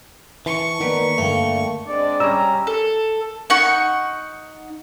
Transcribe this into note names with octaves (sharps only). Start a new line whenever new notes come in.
E3 A5 C#6
D#3 A#3 B3 B4 D5 F#5
G2 D3 A3 A#3 F5 G5
G#3 C4 D4 D5
G3 C#4 A#5 E6
A4
D#4 F#5 C#6